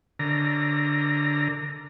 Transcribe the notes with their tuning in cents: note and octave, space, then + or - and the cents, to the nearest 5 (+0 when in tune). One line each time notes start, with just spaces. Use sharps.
D3 +0 A#4 -35 A#5 +0